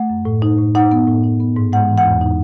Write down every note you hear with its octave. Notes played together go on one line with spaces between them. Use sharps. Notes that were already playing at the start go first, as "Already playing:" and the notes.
Already playing: A3 F#5
F#2
A2
D#4
A2
D#4 F#5
B3
A2
D#4
B3
G#2
G#3 F#5
E3
F#5
E2
D#4